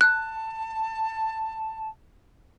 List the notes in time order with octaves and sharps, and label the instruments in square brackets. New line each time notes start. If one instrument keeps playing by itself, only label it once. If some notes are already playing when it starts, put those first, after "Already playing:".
[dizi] A5 [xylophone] F#6